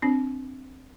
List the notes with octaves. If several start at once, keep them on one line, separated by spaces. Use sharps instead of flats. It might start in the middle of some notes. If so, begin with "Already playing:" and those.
C4 D4